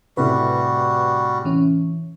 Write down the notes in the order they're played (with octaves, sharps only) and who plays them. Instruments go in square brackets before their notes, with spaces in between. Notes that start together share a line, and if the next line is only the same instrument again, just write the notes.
[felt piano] A2 C3 [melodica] G3 F#4 [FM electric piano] B4
[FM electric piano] E3 C#4